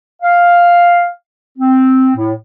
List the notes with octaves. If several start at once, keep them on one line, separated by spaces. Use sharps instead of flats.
F5
C4
A2